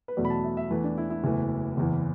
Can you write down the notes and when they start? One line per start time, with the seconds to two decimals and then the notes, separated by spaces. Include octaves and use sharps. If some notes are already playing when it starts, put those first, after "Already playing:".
0.08 B4
0.17 E2 B2 F#3 A3 D5
0.25 B5
0.30 A5
0.44 E5
0.57 E5
0.70 E2 E3 A3 B4
0.84 D4
0.98 E4
1.10 E4
1.24 F#1 E2 E3 A3
1.77 F#1 E2 E3